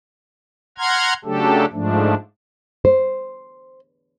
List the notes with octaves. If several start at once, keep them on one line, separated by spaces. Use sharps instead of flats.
F#5 A#5 C6 F6 G#6
C#3 F#3 A3 D4 G4 A4
G#2 F3 A3 D4
C5